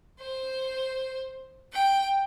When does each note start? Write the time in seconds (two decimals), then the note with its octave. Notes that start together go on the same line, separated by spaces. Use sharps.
0.20 C5
1.72 G5